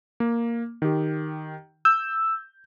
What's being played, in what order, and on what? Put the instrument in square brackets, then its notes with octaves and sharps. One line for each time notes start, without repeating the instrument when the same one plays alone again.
[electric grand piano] A#3
D#3 G4
[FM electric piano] E6 [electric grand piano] G6